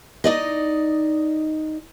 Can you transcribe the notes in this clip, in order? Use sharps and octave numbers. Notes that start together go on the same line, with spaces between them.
D#4 D5 D#5